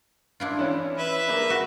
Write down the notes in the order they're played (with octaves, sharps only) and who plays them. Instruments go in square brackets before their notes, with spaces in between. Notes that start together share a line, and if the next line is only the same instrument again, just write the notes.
[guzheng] D4 E4 F4
[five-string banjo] E3 C#4
[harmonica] B4 E5
[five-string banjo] A#3 G#4
[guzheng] F#4